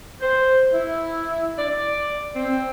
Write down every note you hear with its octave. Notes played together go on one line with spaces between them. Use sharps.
C5
E4
D5
C4